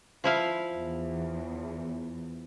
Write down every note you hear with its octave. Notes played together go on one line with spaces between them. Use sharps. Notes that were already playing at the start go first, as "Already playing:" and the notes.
F3 E4 F5
E2